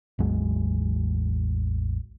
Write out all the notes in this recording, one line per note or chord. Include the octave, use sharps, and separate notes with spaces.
A1 E2 F#3 G#3